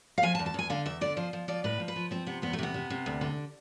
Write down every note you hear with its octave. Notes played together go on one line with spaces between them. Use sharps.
F5
F3 G#5
A5
E2
A5
E2 G#5
D3 F5
E2 E5
D3 D5
F3 C5
F3
F3 D5
A2 B4
F3
B4
F3
F3 C4
C3 B3
E2 B3
A3
C3 B3
C3
C3
D2
D3